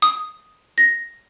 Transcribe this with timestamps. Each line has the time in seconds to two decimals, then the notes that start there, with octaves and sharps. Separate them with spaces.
0.02 D#6
0.78 A#6